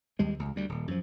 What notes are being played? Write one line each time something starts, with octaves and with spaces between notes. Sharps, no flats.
D#2 G3 G#3
C#2
D2 G3
D#1
F#2 F3